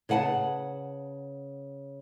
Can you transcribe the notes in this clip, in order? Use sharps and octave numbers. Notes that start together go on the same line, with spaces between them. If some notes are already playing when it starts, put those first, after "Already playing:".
C#3 B4 F#5 G#5 A5